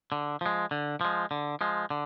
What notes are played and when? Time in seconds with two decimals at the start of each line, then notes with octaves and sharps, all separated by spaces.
0.12 D3
0.41 F3 G#3
0.71 D3
1.01 F3 G#3
1.31 D3
1.61 F3 G#3
1.90 D3